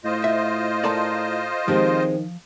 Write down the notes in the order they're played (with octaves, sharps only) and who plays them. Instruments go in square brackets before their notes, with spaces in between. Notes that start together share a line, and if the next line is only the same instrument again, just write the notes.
[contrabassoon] A2 [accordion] F4 C5 D#5
[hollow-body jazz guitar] E5
[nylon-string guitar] A4 A#4 [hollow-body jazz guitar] D5 A5 A#5
[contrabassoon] D#3 [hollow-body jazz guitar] F3 [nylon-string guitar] G#3 C4 G4